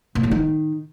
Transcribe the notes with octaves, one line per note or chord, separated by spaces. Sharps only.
A#2
A2
D#3